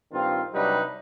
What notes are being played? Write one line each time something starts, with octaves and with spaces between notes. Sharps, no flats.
G2 D#3 C4 F4
C3 F#3 G3 D4 D#4 B4